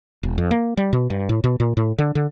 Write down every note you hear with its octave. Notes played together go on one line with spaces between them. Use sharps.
E1
F2
A#3
G3
B2
G2
A2
B2
A#2
A2
D3
D3